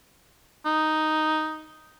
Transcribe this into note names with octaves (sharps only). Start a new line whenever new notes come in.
D#4